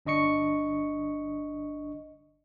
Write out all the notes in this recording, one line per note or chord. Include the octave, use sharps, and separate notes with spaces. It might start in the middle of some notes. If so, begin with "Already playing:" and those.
G1 D4 D#5 C#6 C#7